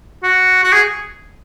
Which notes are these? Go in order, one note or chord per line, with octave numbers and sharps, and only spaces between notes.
F#4
F#4
G#4